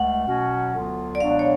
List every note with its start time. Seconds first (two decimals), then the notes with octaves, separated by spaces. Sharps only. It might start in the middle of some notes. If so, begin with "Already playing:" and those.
Already playing: C#2 A3 F#5
0.26 B2 F#3 C#4 F#4
0.74 D2 D3 F#3 B3 F4
1.15 D5
1.20 C#2 B2 F#3 B3 D4 F5
1.39 C#5